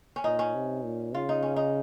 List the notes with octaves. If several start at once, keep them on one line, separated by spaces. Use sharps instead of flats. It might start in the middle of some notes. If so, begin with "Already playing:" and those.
C#4
A#2 D#4
C#4
C3
A#2
C#3 F4
D#4
C#4
D#4